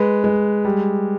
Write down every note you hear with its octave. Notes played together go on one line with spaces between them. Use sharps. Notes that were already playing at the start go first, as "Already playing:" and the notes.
Already playing: G#3 B4
G#3
G3